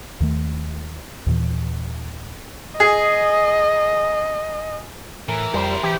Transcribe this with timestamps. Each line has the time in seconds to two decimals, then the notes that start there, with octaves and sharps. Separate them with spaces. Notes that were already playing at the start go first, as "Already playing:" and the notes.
0.20 D#2 D#3 A3
1.26 D#2 A#2 E3
2.80 G#4 D#5
5.28 A2 E3 A#4
5.54 F2 G3 E4 C5
5.83 E3 G4 A#5